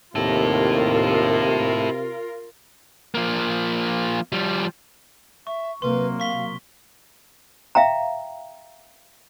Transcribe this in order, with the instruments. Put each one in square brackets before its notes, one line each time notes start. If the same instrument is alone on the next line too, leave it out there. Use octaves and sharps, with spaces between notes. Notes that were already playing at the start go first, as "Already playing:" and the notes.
[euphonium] D#2 [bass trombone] C3 [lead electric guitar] E4 A4 [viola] F4 A#4
[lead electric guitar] F3 A#3
F3 G3
[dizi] E5 [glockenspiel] C#6
[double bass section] C3 F#3 A#3 [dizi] B4 [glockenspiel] C6
[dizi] F5 [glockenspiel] C#6 B6 G7
[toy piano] E5 F5 G5 A#5